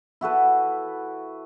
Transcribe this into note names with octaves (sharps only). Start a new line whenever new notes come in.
E4 F#4 A4 B4